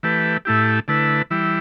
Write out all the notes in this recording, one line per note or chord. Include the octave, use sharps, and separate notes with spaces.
E3 A3 G4 B4
A2 A3 E4 G4
D3 A3 E4 B4
E3 G3 E4